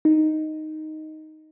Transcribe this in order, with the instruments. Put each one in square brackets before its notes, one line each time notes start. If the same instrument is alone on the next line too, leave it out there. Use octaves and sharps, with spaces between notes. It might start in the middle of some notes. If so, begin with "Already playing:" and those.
[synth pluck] D#4